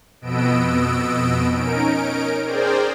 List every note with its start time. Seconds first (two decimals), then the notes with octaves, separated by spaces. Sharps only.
0.21 F2 B2 B3 D#5 E6 D7
1.54 C#4 D#4 A#4 D7
2.44 G#4 A#4 C5 D5 G5